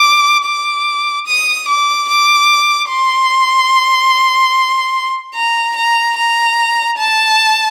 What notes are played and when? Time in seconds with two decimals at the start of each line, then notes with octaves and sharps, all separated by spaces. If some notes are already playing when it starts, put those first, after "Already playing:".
Already playing: D6
0.45 D6
1.26 D#6
1.68 D6
2.09 D6
2.89 C6
5.35 A#5
5.76 A#5
6.17 A#5
6.98 A5